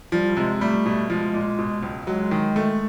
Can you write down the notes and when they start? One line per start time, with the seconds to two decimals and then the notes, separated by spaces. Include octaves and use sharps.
0.12 F3 G3
0.37 C3 G#3
0.61 G3 A3
0.86 B2
1.10 F3 G#3
1.34 A#2
1.59 B2
1.83 C#2
2.07 F#3 G#3
2.31 D#3
2.56 A3